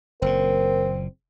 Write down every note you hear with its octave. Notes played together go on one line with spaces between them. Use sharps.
F#1 A#2 C4 A#4